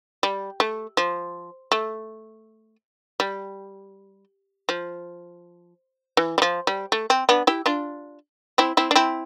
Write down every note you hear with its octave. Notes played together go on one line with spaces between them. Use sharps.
G3
A3
F3
A3
G3
F3
E3
G3
F3
G3
A3
C4
B3 D4
E4 G4
D4 F4
C4 E4
C4 E4
D4
C4 E4